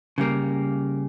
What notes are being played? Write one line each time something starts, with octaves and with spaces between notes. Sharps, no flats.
C#3 G3 A#3